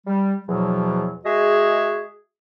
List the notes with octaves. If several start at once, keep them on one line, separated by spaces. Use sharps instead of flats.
G3
E2 B2 F3 F#3
G#3 F#4 G#4 D#5 E5